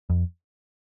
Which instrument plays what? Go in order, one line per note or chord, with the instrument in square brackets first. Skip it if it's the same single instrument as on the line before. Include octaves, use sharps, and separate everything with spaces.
[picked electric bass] F2